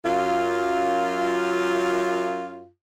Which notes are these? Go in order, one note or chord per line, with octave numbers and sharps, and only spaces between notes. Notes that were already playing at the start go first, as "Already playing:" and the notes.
F#2 F4